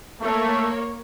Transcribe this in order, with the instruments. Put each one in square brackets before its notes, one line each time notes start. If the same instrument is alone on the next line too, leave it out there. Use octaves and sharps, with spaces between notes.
[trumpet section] A3 [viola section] A#3 C#5